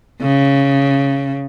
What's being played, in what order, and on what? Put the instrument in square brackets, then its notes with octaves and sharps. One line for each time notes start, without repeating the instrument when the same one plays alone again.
[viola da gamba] C#3